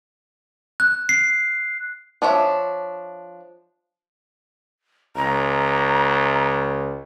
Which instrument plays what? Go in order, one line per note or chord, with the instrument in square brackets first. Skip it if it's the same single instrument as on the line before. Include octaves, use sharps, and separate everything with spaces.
[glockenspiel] F#6
C7
[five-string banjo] F3 D4 C#5 E5
[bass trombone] C#2 [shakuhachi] A#5